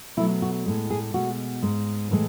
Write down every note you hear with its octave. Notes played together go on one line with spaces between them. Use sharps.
B2 F#3 A3 E4
F#4
A2 G#3
G#4
B2 G#3 F#4
G#2 G#3
A2 E3 G#3